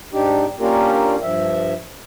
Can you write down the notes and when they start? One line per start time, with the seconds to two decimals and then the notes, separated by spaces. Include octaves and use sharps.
0.13 G#2 D4 D#4 G4
0.60 A#3 C#4 D4 F4 G4 A#4
1.22 G2 F3 E5